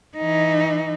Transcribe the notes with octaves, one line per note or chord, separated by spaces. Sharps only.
E3 D#4